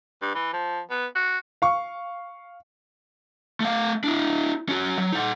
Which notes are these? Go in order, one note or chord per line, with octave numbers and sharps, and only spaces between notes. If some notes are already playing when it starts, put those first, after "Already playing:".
G2
E3
F3
B3
F#4
F5 C#6
A3 F5
D4 E4
C#4 F#4
F#3
D#4 F#5